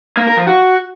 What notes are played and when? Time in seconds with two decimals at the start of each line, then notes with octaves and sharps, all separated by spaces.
0.17 A#3
0.27 A#4
0.37 F3
0.47 F#4